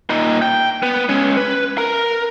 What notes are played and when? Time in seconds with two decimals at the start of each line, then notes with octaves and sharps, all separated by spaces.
0.10 A#2 D#4
0.42 G5
0.83 B3
1.09 G#3 C#4
1.37 B4
1.78 A#4